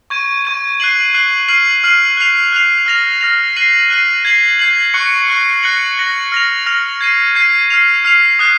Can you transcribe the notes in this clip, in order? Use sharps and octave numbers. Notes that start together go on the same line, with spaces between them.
C#6 G#6 D#7
C#6 G#6 D#7
F#6 C7 D#7 F#7
F#6 C7 D#7 F#7
F6 C7 D#7 F#7
F6 C7 D#7 F#7
F#6 C7 F7
F#6 C7 F7
F6 A#6 F7
F6 A#6 F7
F#6 C7 D#7 F#7
F#6 C7 D#7 F#7
G#6 C7 F#7
G#6 C7 F#7
C#6 F#6 C#7
C#6 F#6 C#7
F#6 A#6 C#7 F#7
F#6 A#6 C#7 F#7
F6 A#6 F7
F6 A#6 F7
G#6 C7 D#7
G#6 C7 D#7
F6 C7 F7
F6 C7 F7
D#6 F#6 C7